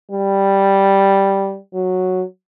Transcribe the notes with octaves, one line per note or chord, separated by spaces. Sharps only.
G3
F#3